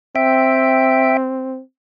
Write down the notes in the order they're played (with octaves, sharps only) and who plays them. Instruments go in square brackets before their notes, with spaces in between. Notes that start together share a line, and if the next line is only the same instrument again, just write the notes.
[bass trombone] C4 [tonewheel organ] E5 G5